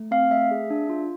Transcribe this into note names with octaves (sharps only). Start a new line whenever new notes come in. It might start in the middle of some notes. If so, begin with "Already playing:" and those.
Already playing: A3
C4 F5
A3 E5
G#4
D4
F4